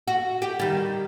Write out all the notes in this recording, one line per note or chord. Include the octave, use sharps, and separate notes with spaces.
F#4
G4
D#3 G3